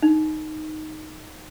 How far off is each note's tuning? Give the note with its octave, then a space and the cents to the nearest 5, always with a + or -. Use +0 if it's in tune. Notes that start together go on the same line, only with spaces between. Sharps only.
D#4 -5